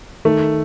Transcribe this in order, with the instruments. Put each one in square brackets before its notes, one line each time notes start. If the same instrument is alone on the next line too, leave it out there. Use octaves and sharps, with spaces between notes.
[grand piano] D#3 [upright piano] A3